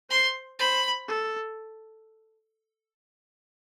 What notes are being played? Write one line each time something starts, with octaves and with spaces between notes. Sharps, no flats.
C5 C6
C5 B5
A4